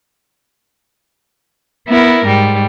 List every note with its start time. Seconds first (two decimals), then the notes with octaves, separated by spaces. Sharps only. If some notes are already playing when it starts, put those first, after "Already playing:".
1.88 B3 E4 A#4
2.25 G#2 G3